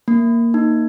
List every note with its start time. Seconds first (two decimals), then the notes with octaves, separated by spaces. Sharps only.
0.08 A#3
0.54 D#4